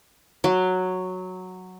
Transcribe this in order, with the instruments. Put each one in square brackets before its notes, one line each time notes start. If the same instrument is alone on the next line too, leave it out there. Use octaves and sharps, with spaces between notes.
[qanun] F#3